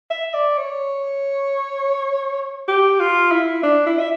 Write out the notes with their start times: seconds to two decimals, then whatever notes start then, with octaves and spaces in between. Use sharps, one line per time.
0.11 E5
0.34 D5
0.58 C#5
2.68 G4
3.00 F4
3.31 E4
3.63 D4
3.87 E4
3.99 E5